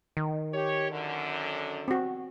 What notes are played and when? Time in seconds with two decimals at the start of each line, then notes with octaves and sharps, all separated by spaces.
0.17 D#3
0.53 G4 C#5
0.91 F#2 D3
1.88 C4 F#4